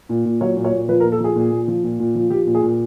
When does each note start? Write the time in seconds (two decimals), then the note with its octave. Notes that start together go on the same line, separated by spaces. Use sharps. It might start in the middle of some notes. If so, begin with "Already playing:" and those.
0.09 A#2
0.25 A#2
0.41 F#3 C#5
0.57 A#2
0.64 C#5
0.73 A#2
0.88 F3 B4
1.00 A#4
1.05 A#2
1.12 A4
1.20 F3 G#4
1.36 A#2
1.51 A#2
1.68 F3
1.84 A#2
2.00 A#2
2.15 F3
2.30 F3 G4
2.46 A#2
2.55 G#4
2.62 A#2